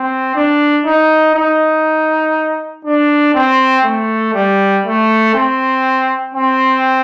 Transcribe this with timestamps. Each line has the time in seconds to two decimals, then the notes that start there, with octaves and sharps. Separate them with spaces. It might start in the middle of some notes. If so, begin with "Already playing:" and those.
Already playing: C4
0.35 D4
0.85 D#4
1.35 D#4
2.85 D4
3.34 C4
3.84 A3
4.34 G3
4.85 A3
5.34 C4
6.34 C4